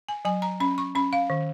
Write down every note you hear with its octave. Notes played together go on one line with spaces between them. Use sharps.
G#5
F#3 G#5
A#5
C#4 B5
C#6
C#4 B5
F5
D#3